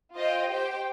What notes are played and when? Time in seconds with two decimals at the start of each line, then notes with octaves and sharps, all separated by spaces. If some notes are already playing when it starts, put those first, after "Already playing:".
0.15 F4 C5 D#5 G5
0.49 G4 C5 G5